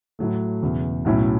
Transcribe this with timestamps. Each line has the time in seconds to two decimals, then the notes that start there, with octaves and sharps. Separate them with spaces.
0.19 A2 F#3 A3
0.62 E1 E2 C#3
1.05 B1 A2 F#3 C#4 E4